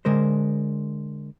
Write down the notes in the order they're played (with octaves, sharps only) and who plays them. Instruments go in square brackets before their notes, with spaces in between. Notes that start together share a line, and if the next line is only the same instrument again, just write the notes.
[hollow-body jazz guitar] D3 G#3 A#4 C5